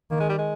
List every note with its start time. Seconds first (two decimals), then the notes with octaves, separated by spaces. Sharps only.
0.11 D#3 A#3
0.20 G#3
0.29 G3
0.38 G#3